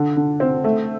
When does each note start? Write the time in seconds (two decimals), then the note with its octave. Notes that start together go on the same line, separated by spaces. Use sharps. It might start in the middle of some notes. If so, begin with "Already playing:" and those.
Already playing: D3
0.16 D3
0.40 C4
0.64 A3